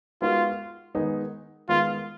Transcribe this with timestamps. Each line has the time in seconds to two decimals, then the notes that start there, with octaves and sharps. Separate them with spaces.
0.22 G#3 B3 D#4 F4 F#4 A#4
0.94 D#3 G#3 B3 D#4 G#4
1.69 D#3 G#3 B3 F4